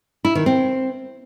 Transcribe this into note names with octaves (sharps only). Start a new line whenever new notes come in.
E4
D#3
C4